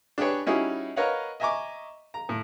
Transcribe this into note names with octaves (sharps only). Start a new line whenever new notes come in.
D4 G4 G#4 B4 C#5
G3 C#4 D#4 E4 F#4 G#4
A#4 B4 C#5 D#5 F5 F#5
D#5 E5 G#5 A#5 C#6 D6
A#5
A2